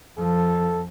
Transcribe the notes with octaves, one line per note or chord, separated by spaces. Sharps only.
F2 F3 A4